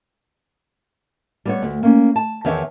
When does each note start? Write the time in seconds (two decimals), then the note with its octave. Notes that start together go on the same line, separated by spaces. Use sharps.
1.45 G3 B3 C#5
1.62 D2
1.83 A#3 C#4
2.16 A5
2.45 E2 D#3 C#5 E5